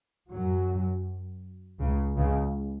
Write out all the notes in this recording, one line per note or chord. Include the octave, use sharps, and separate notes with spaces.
F#2 F#3
C#2 C#3
C#2 C#3